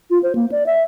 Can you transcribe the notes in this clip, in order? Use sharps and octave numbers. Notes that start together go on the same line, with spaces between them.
F4
C5
A#3
D5
E5